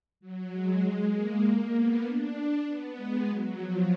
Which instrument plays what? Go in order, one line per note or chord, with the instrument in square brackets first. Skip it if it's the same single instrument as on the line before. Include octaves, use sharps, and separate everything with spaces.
[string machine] F#3
G#3
A#3
B3
D4
B3
G#3
F#3
F3